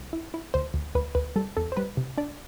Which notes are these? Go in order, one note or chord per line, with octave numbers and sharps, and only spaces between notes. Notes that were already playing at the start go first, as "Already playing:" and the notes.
Already playing: C2
E4
E4
D2 C5
D2
D2 B4
D2 B4
G3 A4
E2 A4
C5
G3 B4
C3
D4 D5